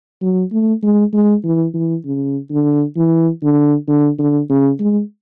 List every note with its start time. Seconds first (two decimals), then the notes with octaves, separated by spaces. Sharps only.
0.22 F#3
0.52 A3
0.83 G#3
1.13 G#3
1.44 E3
1.74 E3
2.05 C#3
2.51 D3
2.96 E3
3.42 D3
3.88 D3
4.19 D3
4.50 C#3
4.80 G#3